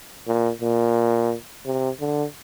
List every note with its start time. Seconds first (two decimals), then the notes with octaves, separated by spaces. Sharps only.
0.27 A#2
0.61 A#2
1.65 C3
2.00 D3